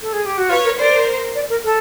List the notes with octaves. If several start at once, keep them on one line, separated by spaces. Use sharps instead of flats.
A4
G#4
G4
F#4
F4 B4 C#5
A#4
A#4 C5 D5
D5
A#4
A4